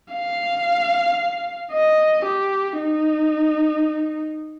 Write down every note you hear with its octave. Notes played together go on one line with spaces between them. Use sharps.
F5
D#5
G4
D#4